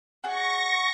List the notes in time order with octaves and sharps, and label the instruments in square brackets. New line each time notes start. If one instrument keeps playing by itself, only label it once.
[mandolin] F#4 G#4 D5 [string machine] C#6 A#6